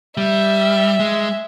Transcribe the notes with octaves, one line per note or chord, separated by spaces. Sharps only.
G3 E5
G#3